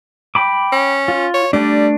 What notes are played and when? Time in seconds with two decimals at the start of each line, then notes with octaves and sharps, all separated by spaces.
0.35 G5 B5 D6
0.72 C#4
1.08 F4
1.34 C#5
1.53 G3 A3 D4